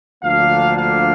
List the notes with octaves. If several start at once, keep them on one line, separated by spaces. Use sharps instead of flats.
D2 D3 F3 A#3 D4 F5
F5